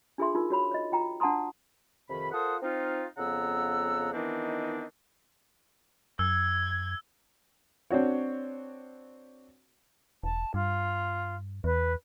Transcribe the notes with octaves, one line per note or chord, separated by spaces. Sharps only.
D4 F4 G#4 A4 E5 C6
D#4 F4 A#4
F#4 C#5 B5
C#5 D#5
F4 G5 A#5
D4 F#5 A5 A#5 C6 D#6
F2 C3 D#3 B5
F4 A4 A#4 C5 F#5 D#6
C4 D#4 F4
F2 C#3 B3 F#5 A#5 E6
D#3 E3 B3 C4 D4 D#4
F#2 E6 G#6
C4 D4 F#4 C#5
E1 A5
G2 F4
E2 B4